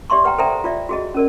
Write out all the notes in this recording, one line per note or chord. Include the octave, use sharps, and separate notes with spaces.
G4 D5 E5 C6 C#6
B4 F#5 G5 A#5
A4 C5 D5 E5 G5 A#5
F4 D5 E5
F#4 G#4 D#5
C#4 A#4 D5